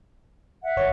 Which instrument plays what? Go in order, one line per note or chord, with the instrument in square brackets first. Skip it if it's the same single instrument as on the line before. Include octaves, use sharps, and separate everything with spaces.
[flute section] E5 F#5
[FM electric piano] G1 C#5